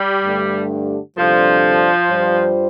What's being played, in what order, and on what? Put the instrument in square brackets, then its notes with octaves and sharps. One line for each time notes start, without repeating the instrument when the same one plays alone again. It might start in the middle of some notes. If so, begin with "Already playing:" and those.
Already playing: [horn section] G3
[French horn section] G2 D3 A3 D4 G4
[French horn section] D2 C3 G3 D4 A4 [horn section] F3
[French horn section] G2 G3 F4 C5